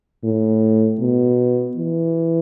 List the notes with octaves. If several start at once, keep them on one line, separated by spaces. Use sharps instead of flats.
A2
B2
E3